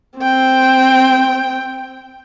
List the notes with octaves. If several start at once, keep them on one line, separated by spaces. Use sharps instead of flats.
C4 G5